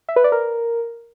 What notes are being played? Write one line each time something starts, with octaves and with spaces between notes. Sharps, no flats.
E5
B4
D5
A#4